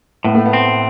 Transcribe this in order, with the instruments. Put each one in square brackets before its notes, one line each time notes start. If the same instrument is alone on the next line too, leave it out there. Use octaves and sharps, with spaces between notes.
[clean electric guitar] A2 [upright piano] B3
[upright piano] A3
B3
[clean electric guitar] C4